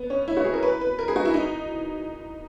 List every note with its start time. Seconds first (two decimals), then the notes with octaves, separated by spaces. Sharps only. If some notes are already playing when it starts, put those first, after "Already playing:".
Already playing: B3
0.10 C#4
0.28 E4
0.37 F#4
0.44 G#4
0.54 A#4
0.63 B4
0.81 B4
0.99 A#4
1.08 G#4
1.16 F#4
1.25 E4
1.34 D#4